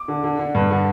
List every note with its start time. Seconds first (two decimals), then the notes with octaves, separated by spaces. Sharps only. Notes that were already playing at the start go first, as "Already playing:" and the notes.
Already playing: D6
0.08 D3
0.24 D3
0.39 D3
0.55 G2
0.71 D3